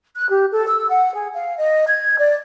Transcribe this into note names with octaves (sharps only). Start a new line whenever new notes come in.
F#6
G4
A4
E6
F#5
G#4
F5
D#5
G#6
D5